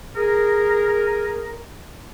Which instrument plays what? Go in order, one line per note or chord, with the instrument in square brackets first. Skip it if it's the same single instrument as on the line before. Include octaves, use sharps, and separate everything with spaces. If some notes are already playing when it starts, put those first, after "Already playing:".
[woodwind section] G#4 A#4